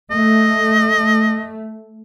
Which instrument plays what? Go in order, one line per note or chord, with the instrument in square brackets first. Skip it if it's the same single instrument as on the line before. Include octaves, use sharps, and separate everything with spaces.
[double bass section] A3 [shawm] D#5